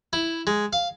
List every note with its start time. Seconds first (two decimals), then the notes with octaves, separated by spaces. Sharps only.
0.13 E4
0.47 G#3
0.73 F5